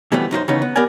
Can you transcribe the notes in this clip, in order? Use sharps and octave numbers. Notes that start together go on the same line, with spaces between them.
B2 E3 G3 A3 B3 C4
F#2 D#4 F4 C5
C#3 E3 B3 C#4 D#4
B3
B3 G4 A#4 D5 G#5